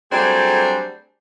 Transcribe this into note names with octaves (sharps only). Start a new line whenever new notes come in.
F#3 G3 A3 C4 D4 G#4